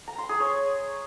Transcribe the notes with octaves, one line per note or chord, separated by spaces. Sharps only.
A#5
C6
G#4
C#5